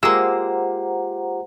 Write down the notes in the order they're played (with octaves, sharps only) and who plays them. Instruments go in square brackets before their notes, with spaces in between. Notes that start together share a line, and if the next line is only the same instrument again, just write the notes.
[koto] G#3 A#3 [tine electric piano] F4 G4 [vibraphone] C5 F#5 A#5 [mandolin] E6